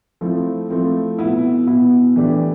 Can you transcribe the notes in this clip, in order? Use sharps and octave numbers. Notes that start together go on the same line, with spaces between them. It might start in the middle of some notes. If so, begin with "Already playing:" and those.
F3 A3 C4 E4
F3 A3 C4 E4
B2 B3 E4
B2 B3 E4
E3 A3 D4 G4